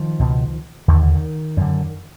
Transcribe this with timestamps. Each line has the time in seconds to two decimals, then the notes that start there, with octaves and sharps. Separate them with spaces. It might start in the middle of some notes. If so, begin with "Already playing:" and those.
Already playing: D#3 F3
0.19 C#2 B2
0.88 D#2 D3 D#3
1.02 D3
1.15 D#3
1.57 F#2 D3